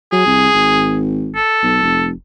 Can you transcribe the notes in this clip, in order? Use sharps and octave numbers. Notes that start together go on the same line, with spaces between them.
F#3 G#4
C2
G#1
A4
B1
F1